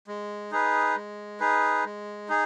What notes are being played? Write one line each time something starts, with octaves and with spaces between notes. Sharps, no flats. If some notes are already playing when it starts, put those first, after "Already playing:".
G#3
D#4 G#4 B4
G#3
D#4 G#4 B4
G#3
D#4 G#4